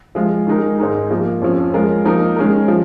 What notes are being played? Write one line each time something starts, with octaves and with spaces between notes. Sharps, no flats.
F3 G#3 F4
D#3 G#3 D#4 A#4
G#2 G#3 D#4 A#4
F3 A#3 F4
F2 F3 C#4
F3 G#3 F4 A#4
F3 A#3 D#4 A#4
D#3 G#3 C#4 A#4
F3